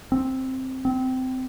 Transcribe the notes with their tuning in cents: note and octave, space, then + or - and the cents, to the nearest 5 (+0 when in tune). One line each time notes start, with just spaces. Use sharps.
C4 +5
C4 -20